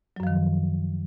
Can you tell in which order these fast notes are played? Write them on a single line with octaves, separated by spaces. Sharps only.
F#3 F#2 F3 D#3